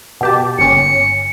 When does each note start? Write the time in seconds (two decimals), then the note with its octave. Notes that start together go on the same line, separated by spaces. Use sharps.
0.21 B2 G4 A5
0.59 G1 C#4 C#7